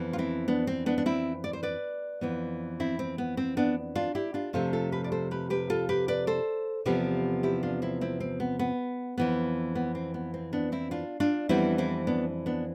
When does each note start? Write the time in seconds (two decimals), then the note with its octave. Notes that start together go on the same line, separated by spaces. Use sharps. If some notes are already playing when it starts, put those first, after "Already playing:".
Already playing: F2 E3 B3
0.13 F4
0.18 C4 E4
0.48 B3 D4
0.67 C4
0.86 B3 D4
0.98 D4
1.06 C4 E4
1.44 D5
1.53 C5
1.63 B4 D5
2.21 F2 E3 B3
2.80 C4 E4
2.99 C4
3.18 B3
3.37 C4
3.57 B3 D4
3.95 D4 F4
4.15 E4 G4
4.34 D4 F4
4.53 F2 C3 F3 A3 F4 A4
4.73 F4 A4
4.92 G4 B4
5.04 D5
5.12 A4 C5
5.31 G4 B4
5.50 G4 B4
5.70 F4 A4
5.89 G4 B4
6.08 B4 D5
6.27 A4 C5
6.85 E2 C3 F3 B3 G4 B4
7.43 E4 G4
7.63 D4 F4
7.82 C4 E4
8.01 C4 E4
8.20 C4
8.40 B3
8.59 B3
9.18 F2 E3 B3
9.75 B3
9.95 C4
10.14 B3
10.34 C4
10.53 B3 D4
10.72 C4 E4
10.91 D4 F4
11.20 D4 F4
11.49 F2 E3 G3 B3 C4 E4
11.78 C4 E4
12.07 B3 D4
12.46 B3 D4